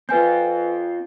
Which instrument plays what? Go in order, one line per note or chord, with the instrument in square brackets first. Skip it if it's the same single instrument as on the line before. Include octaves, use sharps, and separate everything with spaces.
[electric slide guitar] C4 F4 [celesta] B4 G#5 G6